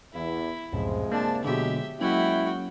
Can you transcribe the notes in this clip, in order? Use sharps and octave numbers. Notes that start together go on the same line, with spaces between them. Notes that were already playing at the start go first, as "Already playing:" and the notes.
E2 E4
C#2 F#2 A2 C3 F3 G#3
A#3 D4 A5
B2 D3 F#3 G#3 G4 E5
F#3 G#3 A#3 C#4 E4 F#4 G5